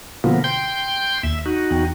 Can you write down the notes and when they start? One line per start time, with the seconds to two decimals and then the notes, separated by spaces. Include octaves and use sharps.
0.24 B2 D3 F3 A#3 B3 F4
0.44 G5 C6 G6
1.23 D#2 E5
1.46 D#4 F#4
1.71 E2 G5